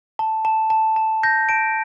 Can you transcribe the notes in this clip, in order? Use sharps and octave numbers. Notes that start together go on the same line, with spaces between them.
A5
A5
A5
A5
G6 A#6
A5 D7